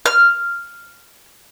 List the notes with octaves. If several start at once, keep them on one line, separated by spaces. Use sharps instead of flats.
F6